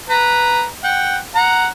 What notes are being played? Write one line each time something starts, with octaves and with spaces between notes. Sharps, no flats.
B4 A#5
F#5 G5
F#5 A#5